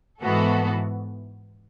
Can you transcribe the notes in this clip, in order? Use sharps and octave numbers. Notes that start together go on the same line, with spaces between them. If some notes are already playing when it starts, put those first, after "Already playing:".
G#2 E3 B3 F#4 A4